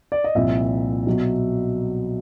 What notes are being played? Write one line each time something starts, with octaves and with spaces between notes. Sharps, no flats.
D5
D#5
C2 A#2 F3 E5
B2 F#3